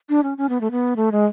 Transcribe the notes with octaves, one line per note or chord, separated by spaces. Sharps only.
D4
C#4
C#4
B3
A3
B3
A3
G#3